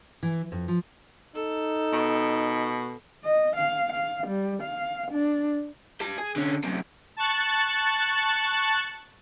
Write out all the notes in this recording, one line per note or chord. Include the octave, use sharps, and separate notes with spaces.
E3
F2
F3
D#4 A4
B2
D#5
F5
F5
G3
F5
D4
G4 A5
G#4
D3 C#4
F#2 C3
A5 C#6 F#6 A6